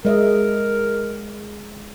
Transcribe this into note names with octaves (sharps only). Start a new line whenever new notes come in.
G#3 A#4 D#5 E5